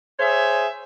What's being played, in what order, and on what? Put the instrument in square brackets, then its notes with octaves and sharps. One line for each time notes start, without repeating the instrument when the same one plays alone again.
[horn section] G#4 C5 C#5 E5